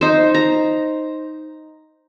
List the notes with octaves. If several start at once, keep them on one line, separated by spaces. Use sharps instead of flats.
D#4 C5
A#5